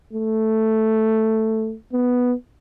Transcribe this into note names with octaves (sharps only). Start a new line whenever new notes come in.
A3
B3